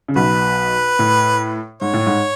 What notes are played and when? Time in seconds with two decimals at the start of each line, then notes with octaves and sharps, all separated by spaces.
0.08 C#3
0.16 B1 B2 B4
0.99 A2
1.81 G#2 C#5
1.93 A2
2.06 G#2